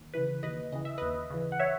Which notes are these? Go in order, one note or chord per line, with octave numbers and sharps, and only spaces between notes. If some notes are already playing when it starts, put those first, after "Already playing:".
Already playing: D#2
C#3 E3 B4
D#2 B4 D#5
C#3 E3 D#5
E5
D#2 B4 D#5
C#3 E3
F#5
C#5 E5